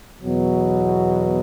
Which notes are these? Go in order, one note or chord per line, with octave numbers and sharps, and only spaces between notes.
E2 B2 F#3